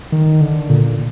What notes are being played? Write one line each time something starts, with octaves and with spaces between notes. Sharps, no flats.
D#3
D3
A#2